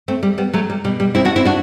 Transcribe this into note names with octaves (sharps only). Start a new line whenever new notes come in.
A3 C4
G3
G3 B3
F#3 A3
G3
B2 G3
G3
C4 E4
D4 F#4
C4 E4
D4 F#4